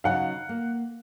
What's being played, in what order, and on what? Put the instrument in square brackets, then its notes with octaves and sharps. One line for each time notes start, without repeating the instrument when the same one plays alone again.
[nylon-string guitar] C#3 F#3 D#4 [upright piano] F5 F#5
[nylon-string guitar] A#3